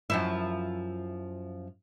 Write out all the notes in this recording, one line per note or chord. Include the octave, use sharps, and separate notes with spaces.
F#2 F3 E4